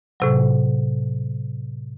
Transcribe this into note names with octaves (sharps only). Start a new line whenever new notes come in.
A2 C3 F#3